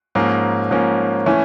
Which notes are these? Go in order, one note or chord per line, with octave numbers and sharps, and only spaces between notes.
G#2 F3 A#3 C#4
G#2 F3 A#3 C#4
E3 A3 C#4